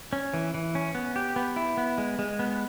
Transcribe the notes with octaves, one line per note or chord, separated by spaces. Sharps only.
C#4
E3
E3
C#4
B3
G4
B3
E4
B3
G#3
G#3
B3